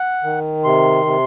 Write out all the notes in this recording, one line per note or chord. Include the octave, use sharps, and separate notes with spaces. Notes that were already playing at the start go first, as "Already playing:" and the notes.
Already playing: F#5
D#3
C3 C6
C3